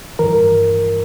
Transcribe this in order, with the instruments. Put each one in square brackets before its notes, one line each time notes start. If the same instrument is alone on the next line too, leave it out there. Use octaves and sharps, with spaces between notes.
[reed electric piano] G2 E3 A#4